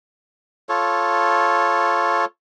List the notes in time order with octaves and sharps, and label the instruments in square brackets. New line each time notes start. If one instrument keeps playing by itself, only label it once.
[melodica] F4 A4 C#5